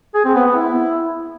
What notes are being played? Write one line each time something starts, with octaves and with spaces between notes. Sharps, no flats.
G#4
C4
B3
B3
E4